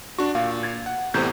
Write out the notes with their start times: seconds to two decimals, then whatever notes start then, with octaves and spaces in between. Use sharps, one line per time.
0.19 D4 F#4 C#6
0.35 A#2 F5
0.63 G#6 A6
0.86 F#5
1.14 E2 A2 C3 C5 A#5 G6